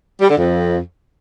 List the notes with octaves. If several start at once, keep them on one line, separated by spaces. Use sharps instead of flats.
G3
D3
F2